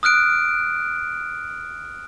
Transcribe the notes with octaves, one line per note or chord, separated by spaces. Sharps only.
D#6 F6 F#6 D7